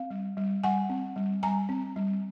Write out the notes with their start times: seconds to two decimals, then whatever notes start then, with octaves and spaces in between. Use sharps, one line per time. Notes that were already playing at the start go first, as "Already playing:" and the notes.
Already playing: C4 F5
0.10 G3
0.37 G3
0.64 G3 F#5 G#5
0.90 C4
1.16 G3
1.43 G3 G#5 A#5
1.69 C4
1.96 G3